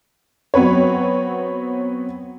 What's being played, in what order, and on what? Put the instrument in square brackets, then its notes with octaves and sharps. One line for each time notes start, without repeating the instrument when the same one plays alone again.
[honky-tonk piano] F#3 B3 C4 B4 C#5